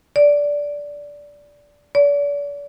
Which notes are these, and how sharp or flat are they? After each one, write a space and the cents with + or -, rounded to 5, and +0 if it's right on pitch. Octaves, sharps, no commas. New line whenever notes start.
D5 -15
D5 -40